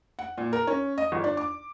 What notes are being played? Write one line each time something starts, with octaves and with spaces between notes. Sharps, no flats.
F#5
A#2
A#4
C#4
D#5
G1
D4
D6